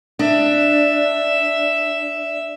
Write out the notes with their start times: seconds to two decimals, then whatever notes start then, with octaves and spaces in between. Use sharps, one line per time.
0.19 D4 E5